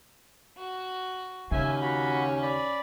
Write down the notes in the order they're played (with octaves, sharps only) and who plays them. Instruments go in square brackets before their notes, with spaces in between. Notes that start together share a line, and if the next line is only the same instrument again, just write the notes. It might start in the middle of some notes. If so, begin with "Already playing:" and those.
[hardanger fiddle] F#4
[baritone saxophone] D#2 [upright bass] C#3 [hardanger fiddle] C#4 [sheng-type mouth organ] E5 G#5
[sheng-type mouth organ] F#4 B5
D5 B5